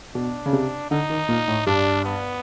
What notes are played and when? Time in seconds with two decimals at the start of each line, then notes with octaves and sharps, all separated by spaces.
0.15 B2 D4
0.46 C#3
0.53 C3
0.90 D3 D#4
1.10 D#3
1.28 A#2
1.48 A2
1.66 G2 D4
2.05 B3